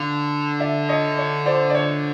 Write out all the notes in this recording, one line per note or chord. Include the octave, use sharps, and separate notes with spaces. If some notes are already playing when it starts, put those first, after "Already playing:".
Already playing: D3 F5
D5 E5
C#5 D#5
C#5
C5 D5
D5
C#5